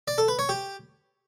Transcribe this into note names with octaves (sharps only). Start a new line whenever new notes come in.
D5
A4
B4
C#5
G4